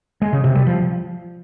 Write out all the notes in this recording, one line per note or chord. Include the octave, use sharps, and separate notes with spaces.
G#3
C#3
C3
G3
F3